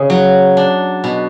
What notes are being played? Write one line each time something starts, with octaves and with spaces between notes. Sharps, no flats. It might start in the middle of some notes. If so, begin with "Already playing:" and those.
Already playing: C#3
F#3
D4
B2